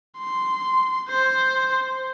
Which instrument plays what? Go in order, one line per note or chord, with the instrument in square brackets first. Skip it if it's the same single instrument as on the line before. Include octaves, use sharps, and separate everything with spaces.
[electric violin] C6
C5